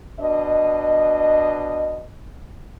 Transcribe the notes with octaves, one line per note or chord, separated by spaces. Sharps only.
B2 D4 D#5